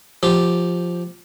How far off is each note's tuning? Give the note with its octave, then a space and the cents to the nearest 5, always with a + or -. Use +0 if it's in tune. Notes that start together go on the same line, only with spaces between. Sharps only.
F3 +0 G4 +0